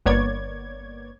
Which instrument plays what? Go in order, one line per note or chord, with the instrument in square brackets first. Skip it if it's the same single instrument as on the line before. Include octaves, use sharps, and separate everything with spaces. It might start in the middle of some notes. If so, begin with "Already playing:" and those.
[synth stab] G1 A#3 B3 C#5 D5 G#6